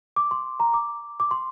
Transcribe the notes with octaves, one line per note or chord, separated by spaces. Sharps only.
D6
C6
A#5
D6
D6
C6